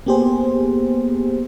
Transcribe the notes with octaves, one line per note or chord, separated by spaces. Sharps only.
A#3 B3 G4 G#4 C5